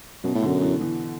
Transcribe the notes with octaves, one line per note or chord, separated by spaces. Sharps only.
F#2 B2
A2
F#2 D3
E3
E3